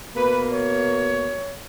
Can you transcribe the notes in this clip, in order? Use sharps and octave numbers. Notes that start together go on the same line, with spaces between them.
B2 A#3 B4
C#5